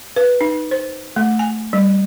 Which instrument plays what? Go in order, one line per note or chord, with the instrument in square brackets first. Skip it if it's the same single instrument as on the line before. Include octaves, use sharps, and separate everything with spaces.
[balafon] B4
D#4
C5
A3
G#5
G3